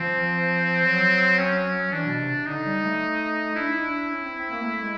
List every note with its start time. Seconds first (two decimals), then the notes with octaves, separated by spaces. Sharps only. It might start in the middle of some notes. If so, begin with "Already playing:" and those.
Already playing: F3 C4
0.84 F#3
1.38 C#4
1.92 E3 D4
2.05 B2
2.19 C3
2.46 D3 D#4
2.65 G3
2.83 A3
3.55 D4 E4
3.68 D#4
3.82 D4
3.96 D4
4.09 C#4
4.23 C4
4.36 C4
4.50 A#3
4.63 A3
4.81 G#3